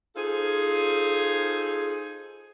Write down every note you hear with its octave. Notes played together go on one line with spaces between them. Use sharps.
D#4 F4 G#4 A4 C5